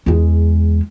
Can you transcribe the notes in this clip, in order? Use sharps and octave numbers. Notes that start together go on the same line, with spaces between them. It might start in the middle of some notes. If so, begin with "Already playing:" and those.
E2 G#3